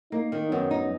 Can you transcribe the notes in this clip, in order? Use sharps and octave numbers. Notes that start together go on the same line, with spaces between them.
A#3 D#4
D#3
F#2 B3
D#4